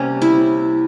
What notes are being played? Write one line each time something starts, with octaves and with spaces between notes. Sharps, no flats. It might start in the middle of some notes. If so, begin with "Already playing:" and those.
Already playing: C3 G3 A#3 C#4
E4